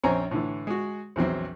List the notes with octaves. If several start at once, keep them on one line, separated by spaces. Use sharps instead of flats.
A#1 C4 C#4 C#5 G#5 A#5
A2 D3 E3
G#3 F#4
A#1 E2 F#3 C4